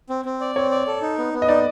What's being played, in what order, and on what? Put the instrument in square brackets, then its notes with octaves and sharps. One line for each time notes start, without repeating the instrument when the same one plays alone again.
[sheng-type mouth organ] C4
C4
D5
[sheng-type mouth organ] C4 [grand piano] C#5
[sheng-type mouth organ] D5
A4
D#4
B3
B3
[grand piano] D#5
[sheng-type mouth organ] D#4 [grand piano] D5